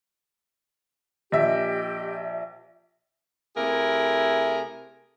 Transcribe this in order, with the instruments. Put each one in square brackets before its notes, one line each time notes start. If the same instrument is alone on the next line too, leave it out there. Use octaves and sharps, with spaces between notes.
[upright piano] A#1 E5 [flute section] G4 D#5
[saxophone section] C3 A3 E4 G#4 A#4